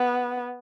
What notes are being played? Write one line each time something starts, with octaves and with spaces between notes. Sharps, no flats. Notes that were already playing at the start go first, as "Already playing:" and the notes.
Already playing: B3